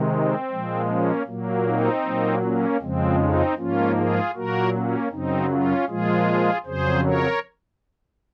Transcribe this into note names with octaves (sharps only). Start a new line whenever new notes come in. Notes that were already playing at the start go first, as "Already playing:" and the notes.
Already playing: C3 D#3 G#3
C4
A#2 F3 G#3
A#3 C#4
A#2 F#3 A#3
C4 D#4
A#2 F#3 A#3
A#3 C#4
F2 C#3 F3 G#3 C4
C4 D#4
G#2 F3 A#3 C#4 F4
F4 G#4
A#2 F#3 A#3 F#4 A#4
A#3 C#4
F#2 C#3 F#3 C4 D#4
C#4 F4
A#2 F3 G#3 F4 G#4
F2 C#3 F#3 G#4 C5
A#4 C#5